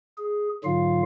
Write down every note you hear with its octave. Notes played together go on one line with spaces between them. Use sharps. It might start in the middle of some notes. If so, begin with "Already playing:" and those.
G#4
G#2 D3 F#3 F4 F5